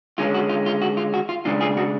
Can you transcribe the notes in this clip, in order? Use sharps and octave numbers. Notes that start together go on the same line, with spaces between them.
D3 G#3 C#4 F4
F#4
F4
F4
F#4
F4
F#4
F4
C#3 G#3 D4 F4
F4 G#4
F#4